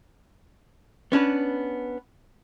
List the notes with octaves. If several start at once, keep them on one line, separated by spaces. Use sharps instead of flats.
B3 C#4 D4 B4